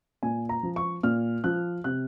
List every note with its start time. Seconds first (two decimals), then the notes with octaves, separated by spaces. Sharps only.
0.23 A#2 G#5
0.49 A#5
0.63 F3
0.76 C#6
1.03 A#2 F6
1.44 F3 F#6
1.84 C3 F#6